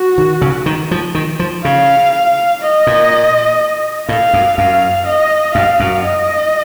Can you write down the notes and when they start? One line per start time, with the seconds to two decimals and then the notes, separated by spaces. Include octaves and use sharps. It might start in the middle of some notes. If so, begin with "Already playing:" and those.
Already playing: F#4
0.18 D#3
0.42 C#3
0.66 D#3
0.91 F3
1.15 D#3
1.40 F3
1.64 C#3 F5
2.62 D#5
2.87 A#2
4.09 A2 F5
4.33 F#2
4.57 F#2 F5
5.06 D#5
5.54 F#2 F5
5.80 F#2
6.04 D#5